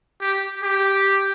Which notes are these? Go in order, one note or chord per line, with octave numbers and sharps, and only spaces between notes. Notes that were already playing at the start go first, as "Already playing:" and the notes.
G4
G4